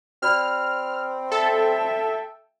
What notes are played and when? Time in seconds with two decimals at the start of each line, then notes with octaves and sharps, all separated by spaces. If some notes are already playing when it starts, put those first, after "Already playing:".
0.22 C4 F#4 D5 B5 F6
1.32 A4 E5 G5